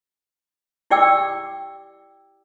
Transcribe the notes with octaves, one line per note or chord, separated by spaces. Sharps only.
E4 G4 D5 G5 D6 E6